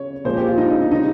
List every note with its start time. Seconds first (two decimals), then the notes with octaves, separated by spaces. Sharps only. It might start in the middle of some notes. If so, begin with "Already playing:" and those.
Already playing: C#3 C#5
0.25 A#2 F3 G#3 C5
0.37 G4
0.47 F4
0.58 D#4
0.70 D#4
0.81 D#4
0.91 C#3 G3 D#4